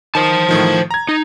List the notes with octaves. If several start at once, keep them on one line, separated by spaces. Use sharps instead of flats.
D#3 C5 A5
A2 D#3 F3
A#5 G#6
D#4